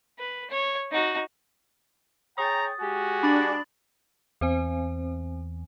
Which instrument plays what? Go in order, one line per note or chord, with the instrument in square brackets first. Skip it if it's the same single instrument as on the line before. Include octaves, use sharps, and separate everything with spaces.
[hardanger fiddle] B4
C#5
D#4 F#4
[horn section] G#4 C#5 G5 [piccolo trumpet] A#5 [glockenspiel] D#6 A6
[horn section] G#3 G4 G#5 [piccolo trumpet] F#4
[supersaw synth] D4 [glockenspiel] B5 A6 F#7
[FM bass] E2 [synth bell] C4 C5 G#5